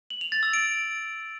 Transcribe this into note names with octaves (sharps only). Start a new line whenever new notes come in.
F#7
F7
A6
E6
D7